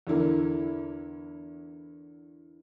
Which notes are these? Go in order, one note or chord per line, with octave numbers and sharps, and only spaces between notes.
E2 D3 E4 A#4